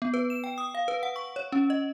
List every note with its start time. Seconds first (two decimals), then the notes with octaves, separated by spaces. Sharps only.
0.02 B3
0.14 B4
0.30 E7
0.44 G5
0.58 D#6
0.75 F5
0.88 B4
1.03 F#5
1.16 C#6
1.36 C#5
1.52 C#4
1.70 D#5